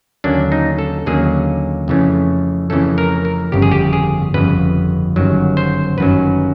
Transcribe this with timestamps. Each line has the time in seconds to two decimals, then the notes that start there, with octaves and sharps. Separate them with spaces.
0.24 D#2 D3 F#3 A#3 C#4 D4
0.52 D#4
0.79 A4
1.06 D#2 D3 F#3 A#3 C#4 G#4
1.88 F2 C#3 E3 A3 C#4
2.70 F2 C#3 E3 A3 C#4 A4
2.98 A#4
3.25 A#4
3.52 G1 F2 C#3 G4
3.62 G#4
3.71 G4
3.93 G#4
4.34 G1 F2 C#3 B4
5.16 G1 F#2 D#3 F#3
5.57 C5
5.98 G1 F#2 D#3 F#3 B4